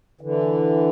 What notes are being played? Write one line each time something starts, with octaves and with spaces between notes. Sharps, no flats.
D3 E3